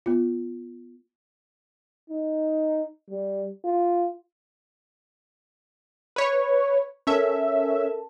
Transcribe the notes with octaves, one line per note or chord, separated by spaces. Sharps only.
B3 F4
D#4
G3
F4
B4 C#5
C#4 A4 A#4 E5 A5